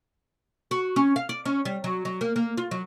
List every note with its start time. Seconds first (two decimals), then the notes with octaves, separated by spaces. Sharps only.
0.71 F#4
0.96 C#4
1.16 F5
1.29 D5
1.45 C#4
1.65 G3
1.84 F#3
2.05 F#3
2.21 A#3
2.36 A#3
2.57 F4
2.71 F#3